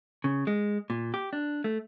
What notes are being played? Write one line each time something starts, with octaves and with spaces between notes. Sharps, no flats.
C#3
G#3
A#2
G4
D4
A3